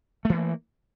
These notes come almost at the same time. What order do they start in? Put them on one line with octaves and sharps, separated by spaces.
A3 E3 A#3